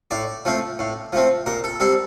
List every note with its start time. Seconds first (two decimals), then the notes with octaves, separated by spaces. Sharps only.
0.11 A2 D5
0.45 F3 A3 C4
0.79 A2
1.13 F3 A3 C4
1.46 A#2 A#4
1.64 A4
1.80 G3 C4 A4